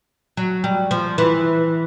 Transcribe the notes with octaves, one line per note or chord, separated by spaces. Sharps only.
F#3
G3
F3
E3